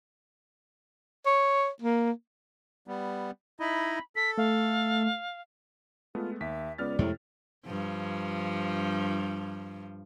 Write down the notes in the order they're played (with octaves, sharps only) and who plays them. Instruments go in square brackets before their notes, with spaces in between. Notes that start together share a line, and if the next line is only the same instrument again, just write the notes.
[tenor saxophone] C#5
A#3
[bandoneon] G3 B3
[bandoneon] D#4 E4 D#5 [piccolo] B5
[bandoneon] A4 [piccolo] B6
[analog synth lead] A3 [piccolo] F5
[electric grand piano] G#3 A3 B3 [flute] F4
[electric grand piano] D#2 B6 [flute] E5
[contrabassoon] C#2 [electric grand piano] B3 F6 A6 [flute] D5
[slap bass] F2 G#3 [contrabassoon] A2 [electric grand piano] C3
[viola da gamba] G2 F3